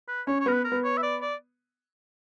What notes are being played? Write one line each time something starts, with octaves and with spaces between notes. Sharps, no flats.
B4
C#4 C#5
C#5
B3 A#4
B4
A#4
B3
C#5
E5
D5
D5